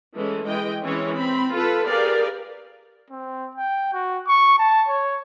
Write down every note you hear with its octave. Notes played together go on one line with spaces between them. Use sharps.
E3 G#3 A3 C#4
E3 G#3 D#5 G5
E3 G#3 C4 C#4 C#5
C4 B5
F4 A4 B4
G4 G#4 A#4 B4 D5 F5
C4
G5
F#4
C#6
A5
C#5